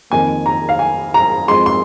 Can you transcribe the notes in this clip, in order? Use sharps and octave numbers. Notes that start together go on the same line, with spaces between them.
F2 D#3 A#3 G#5
A#5
F5
G#5
A#5
F2 F3 G#3 C6
C6